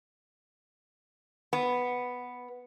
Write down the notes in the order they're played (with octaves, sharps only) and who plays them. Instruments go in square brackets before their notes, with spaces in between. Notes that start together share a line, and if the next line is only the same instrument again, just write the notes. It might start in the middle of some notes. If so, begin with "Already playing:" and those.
[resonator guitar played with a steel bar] B3